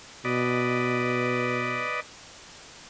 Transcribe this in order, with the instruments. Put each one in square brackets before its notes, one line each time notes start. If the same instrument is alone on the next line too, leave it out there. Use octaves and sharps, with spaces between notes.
[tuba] B2 [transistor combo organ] B4 D5 D#5